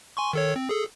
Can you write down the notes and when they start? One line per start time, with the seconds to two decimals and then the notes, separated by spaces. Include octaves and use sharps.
0.17 G#5 C6 C#6
0.33 D#3 A4 C#5
0.56 C4
0.69 G#4 A4